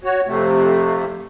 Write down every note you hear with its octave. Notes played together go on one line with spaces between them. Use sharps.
F#4 C#5
F2 C3 A3